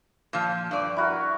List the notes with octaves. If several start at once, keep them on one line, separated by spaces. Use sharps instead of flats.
A#2 F3
G2 D5
E4 F#4 A#4